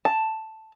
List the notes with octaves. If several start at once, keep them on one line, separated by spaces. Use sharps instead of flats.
A5